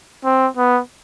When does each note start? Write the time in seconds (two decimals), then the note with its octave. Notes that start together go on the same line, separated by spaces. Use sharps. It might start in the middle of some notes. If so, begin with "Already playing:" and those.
0.25 C4
0.57 B3